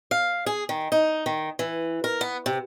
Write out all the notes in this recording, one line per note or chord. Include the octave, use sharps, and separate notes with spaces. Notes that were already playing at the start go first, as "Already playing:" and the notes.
F5
G#4
D#3
D#4
D#3
E3
A#4
B3
C3